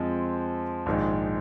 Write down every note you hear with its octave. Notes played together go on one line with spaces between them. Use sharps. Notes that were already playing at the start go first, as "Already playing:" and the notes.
Already playing: F2 F3 G#3 C4
A#1 G#2 D#3 G#3